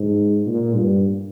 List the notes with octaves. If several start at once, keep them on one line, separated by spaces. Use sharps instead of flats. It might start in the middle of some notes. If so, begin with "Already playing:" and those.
Already playing: G#2
A#2
G2